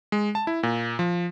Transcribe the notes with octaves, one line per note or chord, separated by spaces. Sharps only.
G#3
A5
E4
A#2
F3